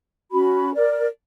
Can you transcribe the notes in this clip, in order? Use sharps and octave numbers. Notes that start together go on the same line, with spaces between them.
C#4 F#4 B5
A#4 D5